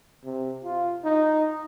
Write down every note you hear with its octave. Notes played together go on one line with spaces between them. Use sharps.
C3
F4
D#4